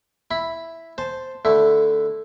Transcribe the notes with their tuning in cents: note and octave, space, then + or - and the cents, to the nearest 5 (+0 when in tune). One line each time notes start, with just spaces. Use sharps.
E4 +0 B5 +0
C5 +0 A5 +0
D3 +0 A3 +0 E4 +0